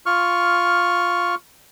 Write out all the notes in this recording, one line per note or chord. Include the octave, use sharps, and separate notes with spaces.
F4 C#6 F6